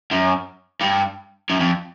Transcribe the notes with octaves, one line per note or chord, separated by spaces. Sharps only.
F#2
G2
F#2
F2